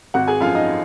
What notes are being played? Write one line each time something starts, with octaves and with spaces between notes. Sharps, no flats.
G#1 F#4 F#5
G#4 G#5
F#2 F3 F4 F5
D#4 D#5